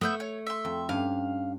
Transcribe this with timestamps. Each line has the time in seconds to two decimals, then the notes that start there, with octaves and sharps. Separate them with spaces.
0.01 A3 B3 E5 G6
0.20 C#5
0.47 E5 C6
0.65 F2
0.89 G2 C#4 F5 G#5